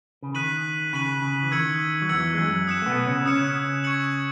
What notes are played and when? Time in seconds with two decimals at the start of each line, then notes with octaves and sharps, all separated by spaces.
0.23 C#3
0.34 D#3 F#6 B6 D#7 F#7
0.93 C#3 F#6 B6 D#7 F#7
1.22 C#3
1.43 E3
1.51 D#3 E6 G#6 C#7 F#7
2.02 F#3
2.09 E2 E3 E6 G#6 C#7 F#7
2.34 G#3
2.38 F#2 F#3
2.67 D#6 F#6 C#7 E7
2.82 A3
2.86 B2 B3
3.06 C#3 C#4
3.25 C#3 C#4 D#6 F#6 C#7 E7
3.84 C#6 G#6 C#7 F#7